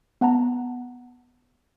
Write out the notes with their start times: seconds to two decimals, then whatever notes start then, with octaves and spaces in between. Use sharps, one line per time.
0.21 B3 F#5 A5 A#5